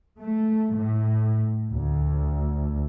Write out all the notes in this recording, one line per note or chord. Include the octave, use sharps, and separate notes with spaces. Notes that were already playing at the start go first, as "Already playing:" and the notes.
A3
A2
D2